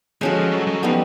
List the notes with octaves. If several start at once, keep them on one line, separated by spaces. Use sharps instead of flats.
F3 G#3 C#4 F#4 A4
F#3
F#3
F3 G3 B3 D#4